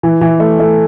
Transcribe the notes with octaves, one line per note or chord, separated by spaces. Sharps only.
E3
E3
A3
A3